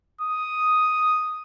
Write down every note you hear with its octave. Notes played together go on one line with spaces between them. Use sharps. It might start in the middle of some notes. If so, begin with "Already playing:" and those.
D#6